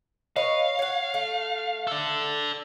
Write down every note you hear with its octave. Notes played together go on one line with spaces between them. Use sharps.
B4 C#5 D#5 F5
C#5 F#5
A3
A4 D5